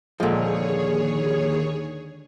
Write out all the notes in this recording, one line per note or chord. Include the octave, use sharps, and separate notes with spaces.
D#2 A#2 D3 F3 G#3 G#4 C#5